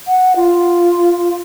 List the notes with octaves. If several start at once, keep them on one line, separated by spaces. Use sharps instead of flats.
F#5
F4